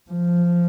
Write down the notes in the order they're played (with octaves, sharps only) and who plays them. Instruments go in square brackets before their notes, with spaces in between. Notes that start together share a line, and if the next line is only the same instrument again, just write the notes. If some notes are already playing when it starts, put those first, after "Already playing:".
[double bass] F3